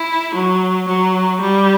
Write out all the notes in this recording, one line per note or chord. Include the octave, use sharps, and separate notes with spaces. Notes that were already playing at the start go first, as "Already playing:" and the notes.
Already playing: E4
F#3
F#3
G3